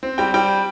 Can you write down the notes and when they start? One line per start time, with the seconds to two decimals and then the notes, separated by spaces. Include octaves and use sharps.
0.03 C4
0.18 G3 G5
0.34 G3 G5